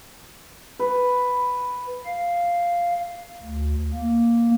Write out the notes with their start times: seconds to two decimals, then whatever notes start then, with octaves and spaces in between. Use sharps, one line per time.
0.79 B4
2.05 F5
3.42 D2
3.94 A#3